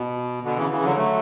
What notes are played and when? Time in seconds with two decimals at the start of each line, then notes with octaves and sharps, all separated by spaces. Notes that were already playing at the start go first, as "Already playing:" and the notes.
Already playing: B2
0.43 B2 D3
0.57 C#3 E3
0.71 C#3 E3
0.84 D3 F#3
0.97 F#3 A3